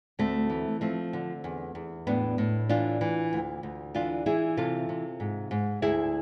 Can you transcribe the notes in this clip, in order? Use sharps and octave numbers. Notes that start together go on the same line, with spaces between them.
D2 A3 C4
E3
F3 A3 C4
D3
E2
E2
A2 B3 D4
A2
E3 D4 F4
E3
D2
D2
E3 D4 F4
E3 E4 G#4
C3 F4 A4
C3
G#2
G#2
D2 E4 G#4